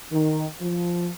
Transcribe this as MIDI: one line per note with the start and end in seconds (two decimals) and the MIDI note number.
0.12 0.45 51
0.61 1.08 53